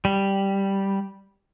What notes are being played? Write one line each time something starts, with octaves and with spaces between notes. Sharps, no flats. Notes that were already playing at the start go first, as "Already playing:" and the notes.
G3